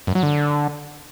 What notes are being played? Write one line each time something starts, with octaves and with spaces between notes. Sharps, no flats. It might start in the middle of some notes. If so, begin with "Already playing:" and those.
F#2
F#3
D3